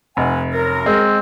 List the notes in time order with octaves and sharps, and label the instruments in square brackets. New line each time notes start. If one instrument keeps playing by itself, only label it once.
[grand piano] F1 [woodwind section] D#4 F#5 G#5
[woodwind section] F#2 A#4
[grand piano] G#3 [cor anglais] C4